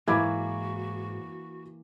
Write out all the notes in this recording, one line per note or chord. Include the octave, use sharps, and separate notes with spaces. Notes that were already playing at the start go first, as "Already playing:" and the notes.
G#2 E3 A#3 F#4 B5 D6 G#6